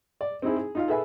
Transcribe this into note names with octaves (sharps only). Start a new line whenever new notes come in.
D5
C4 D#4 E4 G#4
G#4
D#4 F4 F5
G#4 A4 B4 E5 G#5 B5